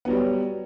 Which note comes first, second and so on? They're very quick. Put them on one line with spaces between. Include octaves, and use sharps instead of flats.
B3 F#3 G3